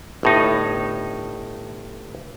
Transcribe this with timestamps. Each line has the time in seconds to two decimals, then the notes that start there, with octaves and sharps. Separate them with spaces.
0.23 G1 A2 D#4